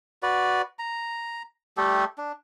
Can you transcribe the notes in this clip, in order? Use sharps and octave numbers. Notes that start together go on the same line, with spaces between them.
F#4 B4 D5
A#5
G3 A3 G4 A4
D4